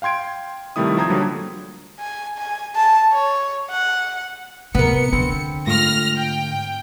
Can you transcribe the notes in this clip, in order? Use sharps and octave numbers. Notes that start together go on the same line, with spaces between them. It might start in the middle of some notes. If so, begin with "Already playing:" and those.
F5 G5 C6 G#6 D7
C3 D#3 G3 A3 E4 D#6
F3 C5 A#5 D#6 G#6
D3 F#3 G3 A#3
G#5
G#5
A5
C#5
F#5
C3 B3 A#4 C#7
D3 C4 B5
G#2 A3 F4 F6 A#6
G5